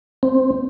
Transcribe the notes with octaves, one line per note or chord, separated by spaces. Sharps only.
C4